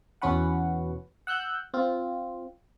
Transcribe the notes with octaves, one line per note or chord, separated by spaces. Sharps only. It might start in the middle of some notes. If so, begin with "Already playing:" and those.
E2 B2 C#4 F#4 B4 F#5
F#5 E6 F#6 G6
C4 F4